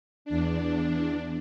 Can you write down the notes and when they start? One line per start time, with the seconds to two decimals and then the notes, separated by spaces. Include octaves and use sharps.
0.25 E2 D4